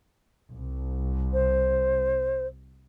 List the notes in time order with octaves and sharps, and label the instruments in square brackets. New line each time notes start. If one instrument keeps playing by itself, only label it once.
[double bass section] C2
[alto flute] C5